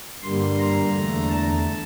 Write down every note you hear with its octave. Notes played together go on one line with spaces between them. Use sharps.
G2 D3 G3 A#3 C6
A#5
E2 D3 A3
A5